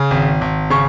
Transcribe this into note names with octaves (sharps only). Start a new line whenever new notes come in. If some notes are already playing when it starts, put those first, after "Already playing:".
Already playing: C#3
G#1
G#1
C#3 C#6